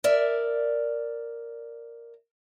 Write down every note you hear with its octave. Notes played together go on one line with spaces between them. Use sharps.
A#4 D5 E5